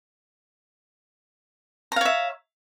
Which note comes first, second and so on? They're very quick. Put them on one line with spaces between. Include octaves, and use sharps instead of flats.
A#5 F5 C#5 E5